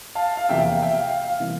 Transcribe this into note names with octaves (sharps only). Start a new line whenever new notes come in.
F5 A5
F5
E2 C3 F3 A#3 E5 G5
F5
F5
E5 G5
F5
F5
F5
C3 E3 G3 A#3